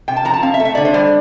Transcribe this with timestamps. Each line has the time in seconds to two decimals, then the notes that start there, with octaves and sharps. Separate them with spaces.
0.08 C3 G5
0.16 A5
0.25 F3 A#5
0.34 A5
0.43 C4 F5
0.54 E5
0.60 A3
0.65 E5
0.75 D3 D5
0.85 C5
0.94 G3 D5